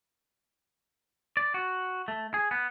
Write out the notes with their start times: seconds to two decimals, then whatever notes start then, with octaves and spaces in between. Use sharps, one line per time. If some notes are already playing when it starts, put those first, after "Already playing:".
1.37 D5
1.54 F#4
2.08 A3
2.34 G#4
2.51 B3